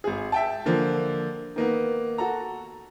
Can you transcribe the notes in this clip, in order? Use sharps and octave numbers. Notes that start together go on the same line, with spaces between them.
G#1 G#4
E5 G5 A5
D3 F3 A#3
D#3 A#3 B3
F#4 A4 A#5